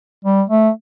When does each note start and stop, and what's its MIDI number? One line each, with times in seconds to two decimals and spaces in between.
0.25 0.43 55
0.50 0.70 57